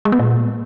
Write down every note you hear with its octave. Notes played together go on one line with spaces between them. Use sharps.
G#3
B3
A#2